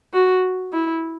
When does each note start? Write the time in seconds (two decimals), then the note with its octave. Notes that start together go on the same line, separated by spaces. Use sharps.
0.13 F#4
0.73 E4